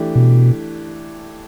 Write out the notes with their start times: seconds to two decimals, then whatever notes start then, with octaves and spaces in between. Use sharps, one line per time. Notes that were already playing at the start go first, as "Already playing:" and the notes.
Already playing: E3 A3 D4 G4
0.15 B2